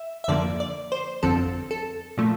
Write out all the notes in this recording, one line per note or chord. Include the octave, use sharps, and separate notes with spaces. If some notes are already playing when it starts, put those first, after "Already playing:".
Already playing: E5
E5
F2 D3 F3 A#3 D5
D5
C5
G1 F2 D3 F3 C4 A4
A4
A#2 F3 A3